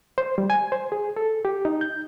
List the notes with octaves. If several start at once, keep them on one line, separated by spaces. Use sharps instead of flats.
C5
G3
G#5
C5
G#4
A4
G4
D#4
G6